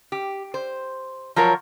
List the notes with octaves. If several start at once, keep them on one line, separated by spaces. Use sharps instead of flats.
G4
C5
F3 F#3 F4 A#4 C#5